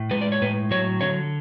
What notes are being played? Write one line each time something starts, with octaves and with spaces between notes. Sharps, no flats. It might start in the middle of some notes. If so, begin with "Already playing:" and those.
Already playing: A2
G#3 B4
D5
C#5
A2 B4
F#3 C#5
D3 C#5